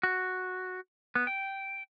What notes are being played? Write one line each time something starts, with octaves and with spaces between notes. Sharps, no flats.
F#4
B3
G5